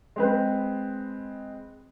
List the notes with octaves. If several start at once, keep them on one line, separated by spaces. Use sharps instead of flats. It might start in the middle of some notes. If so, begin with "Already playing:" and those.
G#3 C4 B4